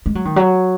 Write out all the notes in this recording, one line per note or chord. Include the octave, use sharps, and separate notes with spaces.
G#3
F#3
D#3
F#3